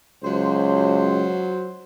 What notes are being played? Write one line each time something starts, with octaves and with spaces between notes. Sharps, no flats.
C#2 F#3 C5